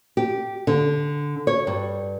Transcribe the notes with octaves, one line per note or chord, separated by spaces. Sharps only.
G4
D3
C#5
G2